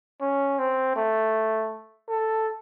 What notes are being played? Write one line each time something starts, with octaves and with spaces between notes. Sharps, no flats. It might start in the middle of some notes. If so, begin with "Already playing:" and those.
C#4
C4
A3
A4